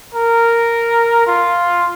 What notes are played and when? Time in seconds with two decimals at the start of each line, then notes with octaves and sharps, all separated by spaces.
0.15 A#4
1.27 F4